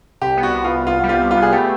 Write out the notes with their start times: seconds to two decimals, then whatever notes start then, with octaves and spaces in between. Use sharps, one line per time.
0.21 C2 G4
0.37 B3
0.43 F#4
0.54 C2
0.64 F4
0.70 C2
0.87 C2 F4
1.03 G3
1.09 F4
1.20 C2
1.31 F4
1.37 B3
1.42 G#4
1.53 A3 G4